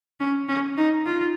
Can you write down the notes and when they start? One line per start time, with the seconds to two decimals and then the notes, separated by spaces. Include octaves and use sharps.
0.20 C#4
0.48 C#4
0.77 D#4
1.06 F4